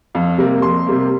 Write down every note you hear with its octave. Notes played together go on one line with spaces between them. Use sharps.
F2 F5
C3 G3 A#3
F2 C6
C3 G3 A#3